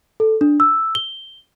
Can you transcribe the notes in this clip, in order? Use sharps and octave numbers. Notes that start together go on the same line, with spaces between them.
A4
D4
E6
G7